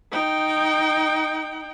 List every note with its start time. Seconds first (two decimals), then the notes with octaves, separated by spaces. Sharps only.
0.12 D#4 G5